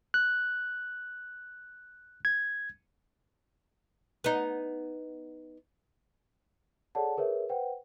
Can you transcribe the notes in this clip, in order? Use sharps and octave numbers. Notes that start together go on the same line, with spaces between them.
F#6
G#6
B3 D#4
G#4 A4 C#5 D5 F#5 A5
G#4 A#4 B4 C#5 E5
B4 C5 F#5 G5